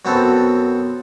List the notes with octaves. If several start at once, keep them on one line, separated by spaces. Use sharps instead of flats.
F#2 F#3 B3 C4 A4